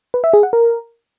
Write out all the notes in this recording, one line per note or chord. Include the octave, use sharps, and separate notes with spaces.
B4
E5
G#4
F#5
A#4